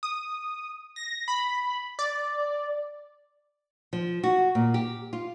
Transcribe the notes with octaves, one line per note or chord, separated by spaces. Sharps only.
D#6
A#6
B5
D5
F3
F#4
A#2
G4
F4